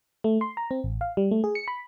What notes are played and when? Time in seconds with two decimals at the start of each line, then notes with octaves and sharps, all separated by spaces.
0.24 A3
0.41 C6
0.57 A#5
0.71 C4
0.84 A1
1.01 F5
1.17 G3
1.31 A3
1.44 G#4
1.55 C#7
1.68 B5